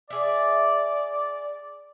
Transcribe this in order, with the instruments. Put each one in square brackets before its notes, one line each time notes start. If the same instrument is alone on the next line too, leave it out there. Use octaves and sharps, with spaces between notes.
[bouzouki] G#4 E5 [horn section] D5